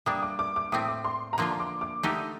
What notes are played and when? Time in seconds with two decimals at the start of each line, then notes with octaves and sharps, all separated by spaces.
0.06 G3 A#3 D4 D#6
0.23 D6
0.39 D6
0.56 D6
0.72 A2 A3 C4 D#6
0.89 D6
1.04 C6
1.33 A#5
1.38 D3 F3 A#3 F4 C6
1.50 C6
1.60 D6
1.81 D6
2.03 D3 A3 D#4 G4 D#6